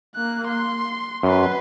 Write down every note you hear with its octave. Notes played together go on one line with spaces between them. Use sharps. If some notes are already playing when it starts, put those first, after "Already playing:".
A#3 F#6
C6
F#2 B4 C6